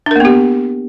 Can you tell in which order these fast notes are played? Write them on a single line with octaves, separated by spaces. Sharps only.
D4 A#4 A#3 B3 G4